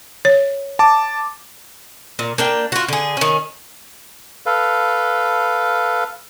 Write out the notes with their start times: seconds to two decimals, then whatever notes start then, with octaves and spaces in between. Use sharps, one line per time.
0.25 C#5
0.79 A5 D6
2.19 A#2
2.38 A#3 D4 G5
2.72 F4 F#4
2.88 D3 G#4
3.17 D#3 C#4
4.46 A4 B4 F5